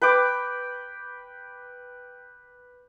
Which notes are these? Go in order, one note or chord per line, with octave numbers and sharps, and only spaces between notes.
B4 G5 D6